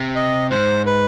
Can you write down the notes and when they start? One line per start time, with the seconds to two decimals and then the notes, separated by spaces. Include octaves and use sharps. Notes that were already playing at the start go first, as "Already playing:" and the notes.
Already playing: C3
0.15 D#5
0.51 G#2 C5
0.86 B4